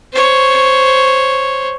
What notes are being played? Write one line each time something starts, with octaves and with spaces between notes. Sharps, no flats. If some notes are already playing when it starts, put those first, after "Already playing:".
C5 C#5